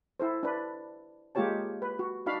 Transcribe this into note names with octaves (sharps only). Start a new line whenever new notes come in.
E4 A4 C5
D4 B4
G#3 A#3 F4 G4 C#5 A5
B4
F#4
D4 D#4 F#4 F5 B5